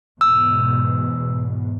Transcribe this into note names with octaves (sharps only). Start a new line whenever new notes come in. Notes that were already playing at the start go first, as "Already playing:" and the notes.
E2 G#2 B2 E6